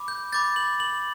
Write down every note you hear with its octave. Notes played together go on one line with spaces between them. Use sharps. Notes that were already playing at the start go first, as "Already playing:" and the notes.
Already playing: B5 D6
G6
B5 D6 G6 A6
F#7
F#7